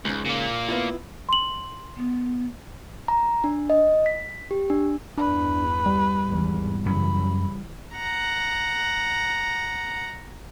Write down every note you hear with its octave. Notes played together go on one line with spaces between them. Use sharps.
C#2 G#2 C#3
A#2 A#3
B3 E4 F4
C6 F#7
B3
A#5
D4
D#5
B6
G4
D4
E2 G2 D4 B4
G3
G#1 E2
F#2 C#3 E3 F#3 C#4 B5
F#5 A#5